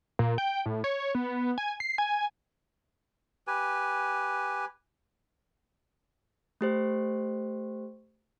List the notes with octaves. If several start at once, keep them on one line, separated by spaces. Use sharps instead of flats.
A#2
G5
A2
C#5
B3
G#5
C7
G#5
G4 B4 G#5
A3 G4 C5